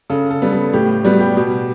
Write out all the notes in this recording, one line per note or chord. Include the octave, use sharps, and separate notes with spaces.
C#3 A4
A4
G3 B3
A4
A2 G4
G3 B3 F#4
G4
B2